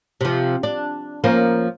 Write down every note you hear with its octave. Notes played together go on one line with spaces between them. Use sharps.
C3 F3
D4
F3 A#3 C#4